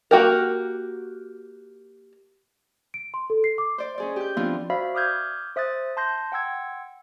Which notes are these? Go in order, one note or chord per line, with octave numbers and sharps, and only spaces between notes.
A#3 F#4 G4 A#4
D7
C6
A4
C7
D6
C5 D5
C#4 G#4 D5
G4 G6
F3 B3 C4 D4 E4 F4
F#4 C5 D5 E5 F5 B5
D6 D#6 F6 G6 G#6
C5 E5 D#6 F#6 A6
A5 C6 G6 A#6
F#5 G5 C6 E6 G#6